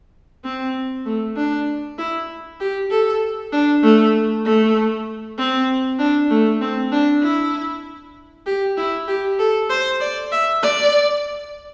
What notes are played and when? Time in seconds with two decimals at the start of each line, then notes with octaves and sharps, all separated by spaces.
0.44 C4
1.06 A3
1.36 D4
1.98 E4
2.60 G4
2.91 A4
3.52 D4
3.83 A3
4.45 A3
5.38 C4
5.99 D4
6.30 A3
6.61 C4
6.92 D4
7.23 E4
8.46 G4
8.77 E4
9.08 G4
9.39 A4
9.70 C5
10.01 D5
10.32 E5
10.63 D5